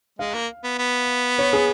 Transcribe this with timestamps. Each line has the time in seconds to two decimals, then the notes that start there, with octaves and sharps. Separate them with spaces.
0.19 G#3 F5
0.34 A#3
0.64 B3
0.78 B3
1.38 C#5
1.53 G#4